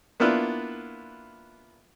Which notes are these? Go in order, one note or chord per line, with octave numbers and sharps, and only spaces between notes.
A#3 B3 D4 E4 F4 B4